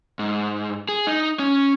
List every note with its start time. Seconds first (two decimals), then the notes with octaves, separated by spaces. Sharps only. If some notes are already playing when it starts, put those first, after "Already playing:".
0.19 G#2
0.89 G#4
1.07 D#4
1.39 C#4